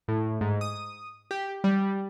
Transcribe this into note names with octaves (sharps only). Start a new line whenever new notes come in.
A2
G#2
D#6
G4
G3